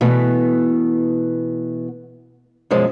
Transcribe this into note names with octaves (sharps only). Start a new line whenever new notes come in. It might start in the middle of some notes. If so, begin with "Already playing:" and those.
B2 E3 A3 B3
F#2 B2 F3 G#3